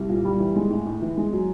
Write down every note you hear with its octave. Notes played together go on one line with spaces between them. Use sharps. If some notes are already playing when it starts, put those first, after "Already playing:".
Already playing: C2
A#2
G3
E3
G#3
A2
A2
E3
G#3
F#3